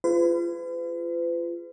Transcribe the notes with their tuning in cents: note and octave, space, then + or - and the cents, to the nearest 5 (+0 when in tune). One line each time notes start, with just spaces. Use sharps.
F4 -25 G#4 +0 B4 +45